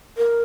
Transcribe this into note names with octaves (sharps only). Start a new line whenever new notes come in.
A#4